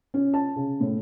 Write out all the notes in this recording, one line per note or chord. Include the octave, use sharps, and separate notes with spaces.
C#4
A5
C#3
A2